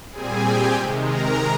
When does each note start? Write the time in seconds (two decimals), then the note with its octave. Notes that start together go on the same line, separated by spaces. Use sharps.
0.11 A#2 G3 C4 G#4 G#5
0.42 G4 G5
0.73 C3 D#3 G#3
1.03 A#4 A#5